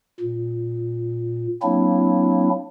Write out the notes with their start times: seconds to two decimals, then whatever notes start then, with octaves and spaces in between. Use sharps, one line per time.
0.20 A#2
1.63 F#3 A#3 C4 D4 E4